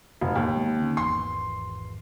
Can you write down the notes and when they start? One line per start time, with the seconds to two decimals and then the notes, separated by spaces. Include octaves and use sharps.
0.21 F1 E2 G#2 B2
0.36 D#2
0.56 G#3 B3
0.81 D3 C#4
0.97 G#1 E2 C6